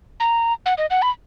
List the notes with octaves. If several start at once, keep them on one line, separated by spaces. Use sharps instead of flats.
A#5
F#5
D#5
F#5
B5